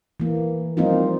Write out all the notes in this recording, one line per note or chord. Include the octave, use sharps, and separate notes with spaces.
E3 A#3
F3 G3 A#3 C4 D#4 F4